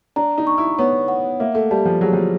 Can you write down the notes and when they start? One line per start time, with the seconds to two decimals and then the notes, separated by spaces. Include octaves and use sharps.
0.16 D4 A#5
0.38 D#4
0.47 C#6
0.58 E4
0.78 B3 C#5
1.08 F#5
1.40 A#3 E5
1.55 A3
1.71 G3 A5
1.85 F3
2.01 F#3 G#4
2.13 F3